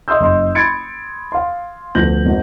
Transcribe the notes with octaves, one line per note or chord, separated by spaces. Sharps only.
D#5 E5 C6 D#6 E6 G6
F#1 D#5 C6
B5 C6 G#6 A6 C#7 D7
F5 C6
D2 F3 B3 G6 A#6 F#7
G#1